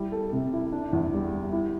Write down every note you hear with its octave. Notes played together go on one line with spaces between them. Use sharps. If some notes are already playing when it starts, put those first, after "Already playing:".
Already playing: G3 E4
A4
C3
E4
D4
E2
G3
G3
E4